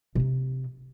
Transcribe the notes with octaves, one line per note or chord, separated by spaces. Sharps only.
C3 D#4